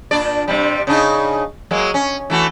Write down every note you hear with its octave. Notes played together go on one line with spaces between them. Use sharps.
A#2 D4 D5
G2 C3 G3
C#3 D4 D#4
F#3 G#3 A#3
C#4
E3 A3 F#4